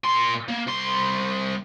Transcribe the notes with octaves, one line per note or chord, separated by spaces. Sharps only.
A#2 C6
A#3
C2 C6